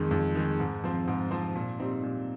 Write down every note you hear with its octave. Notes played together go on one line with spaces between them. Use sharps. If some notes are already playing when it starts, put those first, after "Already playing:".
Already playing: F2 D#3 G#3
F2
D#3 G#3
G#2
F3 C4
G#2
F3 C4
A#2
G3 C4 D#4
A#2